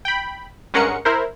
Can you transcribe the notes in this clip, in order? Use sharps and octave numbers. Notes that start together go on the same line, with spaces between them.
G5 B5
G2 G#3 C#4 A#4 F#5 C#7
E4 A#4 C5